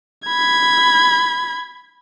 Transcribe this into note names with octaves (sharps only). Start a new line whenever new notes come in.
B5 G#6